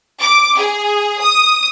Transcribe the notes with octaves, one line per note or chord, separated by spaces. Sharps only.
D6
G#4
D#6